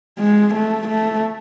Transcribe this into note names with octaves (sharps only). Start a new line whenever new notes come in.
G#3
A3
A3